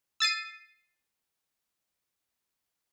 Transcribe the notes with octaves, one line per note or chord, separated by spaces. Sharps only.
E6 A6 C7 D#7